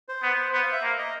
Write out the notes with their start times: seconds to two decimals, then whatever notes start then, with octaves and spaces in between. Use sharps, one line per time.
0.09 C5
0.23 B3
0.53 B3 C5
0.63 F5
0.73 E5
0.83 A#3
0.98 D#5